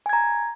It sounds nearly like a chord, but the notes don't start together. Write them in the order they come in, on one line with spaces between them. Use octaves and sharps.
G#5 G#6 A#5